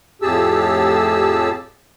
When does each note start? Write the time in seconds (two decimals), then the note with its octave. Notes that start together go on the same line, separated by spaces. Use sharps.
0.22 F2 A2 G4 G#4 A5 E6